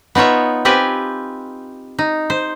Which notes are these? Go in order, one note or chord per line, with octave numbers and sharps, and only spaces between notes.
B3 D#4 F4 C#5 E5
C4 F4 G4 B4 G#5
D#4
C5